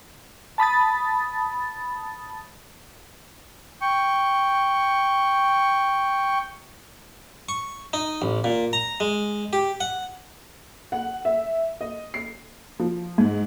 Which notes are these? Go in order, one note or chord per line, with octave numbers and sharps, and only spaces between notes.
A5 B5 D#6 A6
G5 C#6
C#6
D#4
A1
A#2
A#5
G#3
G4
F#5
F#5
E5
D#5
C7
F3
G#2